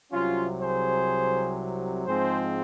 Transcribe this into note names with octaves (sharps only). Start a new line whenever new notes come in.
C2 C3 F#3 C#4 F4
G#4 C5
G#2 F3 G#3 C4 G#4 C5